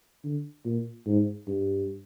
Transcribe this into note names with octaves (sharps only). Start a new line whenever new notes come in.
D3
A#2
G#2
G2